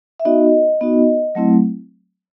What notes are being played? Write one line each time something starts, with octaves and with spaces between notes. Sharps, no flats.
E5
B3 D#4 F#4 D#5
B3 D#4 F#4
F#3 A3 C4 E4